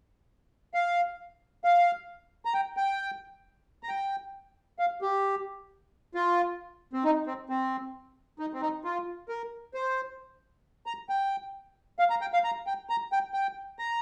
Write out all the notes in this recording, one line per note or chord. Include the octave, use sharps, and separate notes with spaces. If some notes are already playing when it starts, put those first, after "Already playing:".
F5
F5
A#5
G5
G5
A#5
G5
F5
G4
F4
C4
D#4
C4
C4
D#4
C4
D#4
F4
A#4
C5
A#5
G5
F5
A#5
G5
F5
A#5
G5
A#5
G5
G5
A#5